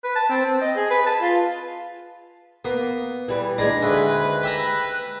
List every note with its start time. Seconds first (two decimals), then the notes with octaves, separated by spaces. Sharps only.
0.04 B4
0.16 A5
0.29 C4
0.46 C4
0.61 D#5
0.76 G#4
0.90 B4
1.06 A5
1.21 F4
2.65 A#3 B3
3.28 E3 G3 B4
3.58 D#2 G#3 D4 D5 A#5
3.83 D2 B4
4.43 G4 E5 A#5